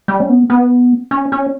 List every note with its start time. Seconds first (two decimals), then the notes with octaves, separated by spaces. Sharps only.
0.08 G3
0.20 C#4
0.29 B3
0.50 B3
1.11 C#4
1.32 C#4